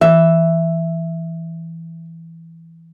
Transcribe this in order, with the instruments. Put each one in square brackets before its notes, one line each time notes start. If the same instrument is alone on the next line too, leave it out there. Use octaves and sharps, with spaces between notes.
[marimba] E3 [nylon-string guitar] E5